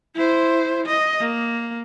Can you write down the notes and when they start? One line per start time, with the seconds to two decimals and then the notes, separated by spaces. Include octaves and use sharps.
0.15 E4 C5
0.86 D#5
1.21 A#3